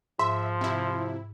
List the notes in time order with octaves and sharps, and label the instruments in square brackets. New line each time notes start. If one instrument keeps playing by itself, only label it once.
[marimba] G#2 [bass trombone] F3 [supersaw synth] E5 [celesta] C6
[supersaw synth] C3 E4